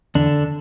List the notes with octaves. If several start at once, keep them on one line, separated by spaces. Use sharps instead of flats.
E2 D3 D4